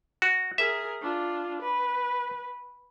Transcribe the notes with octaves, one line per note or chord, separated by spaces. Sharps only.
F#4
G#4 A#4 E5
D4 F4
B4